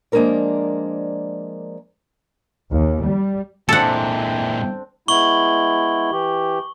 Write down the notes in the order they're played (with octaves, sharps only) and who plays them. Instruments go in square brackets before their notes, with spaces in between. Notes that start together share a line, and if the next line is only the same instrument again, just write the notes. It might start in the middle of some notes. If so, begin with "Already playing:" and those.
[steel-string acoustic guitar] F3 G#3 A#3 D4 A#4 D5
[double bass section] D#2
G3
[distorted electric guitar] A#2 G#3 [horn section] E3 G5 [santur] C4 D4 [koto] A4 F#5
[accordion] G#3 B3 E4 [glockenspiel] C#6 F#7 G7
[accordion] E3 G4